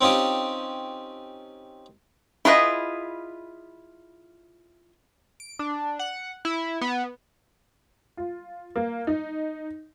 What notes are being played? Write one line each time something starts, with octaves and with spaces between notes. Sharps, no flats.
C4 C#4 D#4 F4 G4
E4 F4 G#4 B4 D#5
D7
D4
F#5
E4
B3
F4
A#3
D#4